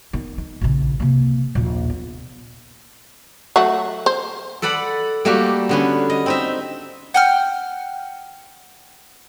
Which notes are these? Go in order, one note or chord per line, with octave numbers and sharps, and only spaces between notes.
D#3 B3
D#3
A#1 C#3
C3 A#3
A#1 D#2
B3
F#3 A3 F#4
C5
A4 B4 D5 F#5 B5
G3 A3 A#3 F#4 G4
D3 B3 C#4
D#5
C4 D#4 E5
F#5 G5 F6